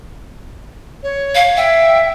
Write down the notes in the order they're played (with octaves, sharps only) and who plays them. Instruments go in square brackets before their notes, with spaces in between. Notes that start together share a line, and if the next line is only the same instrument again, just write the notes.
[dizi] C#5
[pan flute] F5
[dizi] E5 [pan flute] G5